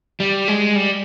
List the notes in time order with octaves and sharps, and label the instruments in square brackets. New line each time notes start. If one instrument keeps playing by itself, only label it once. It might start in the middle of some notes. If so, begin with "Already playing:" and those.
[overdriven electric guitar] G3
G#3
G3